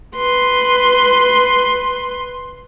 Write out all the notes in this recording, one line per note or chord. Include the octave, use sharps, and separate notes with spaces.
B4 C6